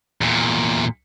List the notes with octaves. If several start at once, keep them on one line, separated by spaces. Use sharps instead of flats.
E2 A#2